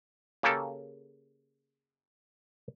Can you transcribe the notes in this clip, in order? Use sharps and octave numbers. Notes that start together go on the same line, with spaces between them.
C#3 A#3 G4 A4